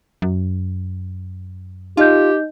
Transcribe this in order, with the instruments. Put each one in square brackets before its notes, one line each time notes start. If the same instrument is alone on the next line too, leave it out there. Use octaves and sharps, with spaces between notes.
[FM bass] F#2
[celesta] D#4 D#5 G6 [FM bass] F4 [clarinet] G4